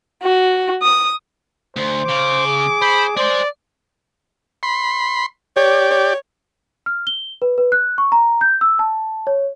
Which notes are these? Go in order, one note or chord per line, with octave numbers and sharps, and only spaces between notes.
F#4
D#6
D2 C5
C#3 D6
G#4
C5 B5
G#4 C5 D5 C6
B5 C6
G4 C#5 D5
C#5
F6
G7
B4
B4
F#6
C#6
A#5
G6
E6
A5
C#5